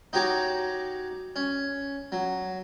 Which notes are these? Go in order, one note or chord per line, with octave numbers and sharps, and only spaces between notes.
D#4 F#4 G4 C#5 A#5 D6
C#4
F#3